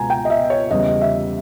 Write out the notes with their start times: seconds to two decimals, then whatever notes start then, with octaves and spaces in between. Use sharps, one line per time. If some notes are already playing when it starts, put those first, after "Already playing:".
Already playing: C#2 B2 G#3 B3 G#5 A#5
0.10 G5
0.25 D#5
0.30 E5
0.50 C#5
0.71 E2 C#3 G3 D#5
1.01 E5